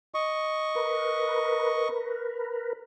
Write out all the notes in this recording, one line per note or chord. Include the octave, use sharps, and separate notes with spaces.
D#5 C#6
A#4 B4